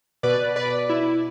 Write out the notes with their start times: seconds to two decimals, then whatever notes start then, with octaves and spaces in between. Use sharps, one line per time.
0.23 B2 B4 D5
0.56 B4 D5
0.89 E4